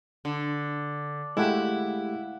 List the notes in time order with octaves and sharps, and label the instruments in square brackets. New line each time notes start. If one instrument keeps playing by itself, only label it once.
[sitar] D3
[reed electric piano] G#3 A3 G4 [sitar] E4 [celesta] F5 F#5 F#6